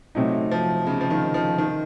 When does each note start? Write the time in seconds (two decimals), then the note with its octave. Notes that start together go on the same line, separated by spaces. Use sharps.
0.15 C3 F#3 A3 C4 D#4
0.51 F3
0.87 C#3
1.01 F3
1.10 D#3
1.34 F3
1.58 D#3